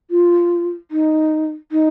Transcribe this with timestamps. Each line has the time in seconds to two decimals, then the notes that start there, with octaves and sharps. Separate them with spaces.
0.10 F4
0.91 D#4
1.72 D#4